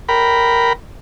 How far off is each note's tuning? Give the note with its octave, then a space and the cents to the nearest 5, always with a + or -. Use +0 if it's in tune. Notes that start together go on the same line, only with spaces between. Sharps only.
A#4 +0 G5 -15 B5 +5